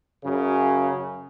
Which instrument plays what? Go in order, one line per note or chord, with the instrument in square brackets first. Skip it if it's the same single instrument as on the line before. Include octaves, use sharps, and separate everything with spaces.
[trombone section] F#2 C#3